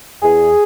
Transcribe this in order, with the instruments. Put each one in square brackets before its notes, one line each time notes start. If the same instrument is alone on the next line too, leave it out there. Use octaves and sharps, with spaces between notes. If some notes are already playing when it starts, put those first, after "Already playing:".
[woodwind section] E2 G#4